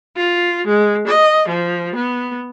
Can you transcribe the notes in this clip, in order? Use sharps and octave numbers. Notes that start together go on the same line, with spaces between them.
F4
G#3
D#5
F3
B3